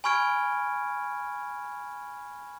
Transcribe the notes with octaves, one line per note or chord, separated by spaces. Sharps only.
G#5 B5 C#6 F6 G#6 D7